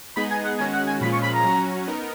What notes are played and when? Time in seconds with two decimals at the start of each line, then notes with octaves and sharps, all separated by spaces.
0.17 G#3 B3 D#4 G#4 D#5 B5
0.31 G#5
0.45 F#5
0.59 D#3 G#3 C#4 F#4 G#5
0.73 F#5
0.87 G#5
1.01 A#2 F3 G#3 C#4 F4 B5
1.12 C#6
1.23 B5
1.34 A#5
1.44 F#3 C#4 F#4
1.88 B3 D#4 A#4